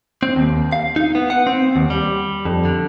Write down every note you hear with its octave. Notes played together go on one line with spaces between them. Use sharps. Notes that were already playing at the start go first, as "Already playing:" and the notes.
C4
D#2
F5
D#4
B3
F#5
C4
D#2
G3
F2
D3